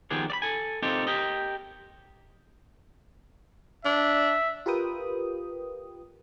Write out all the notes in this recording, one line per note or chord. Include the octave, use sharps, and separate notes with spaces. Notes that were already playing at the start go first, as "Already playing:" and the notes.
D#3 F3 B3 G4 G#4
D5 B5
A4 G#5
C4 D#4 F4 G4 A4 A#4
G4 A#4 D#5
D4 E5
F4 G4 A#4 B4 G5 D#6